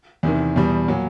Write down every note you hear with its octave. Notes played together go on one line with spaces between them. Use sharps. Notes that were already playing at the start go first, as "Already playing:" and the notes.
E2 C3 D#3
E2 B2 G3
A#2 F#3